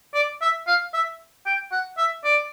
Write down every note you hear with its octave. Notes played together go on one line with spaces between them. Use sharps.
D5
E5
F5
E5
G5
F#5
E5
D5